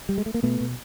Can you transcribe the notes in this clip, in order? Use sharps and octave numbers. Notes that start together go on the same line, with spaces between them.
G3
G#3
A3
A#3
B2 A3 B3
B2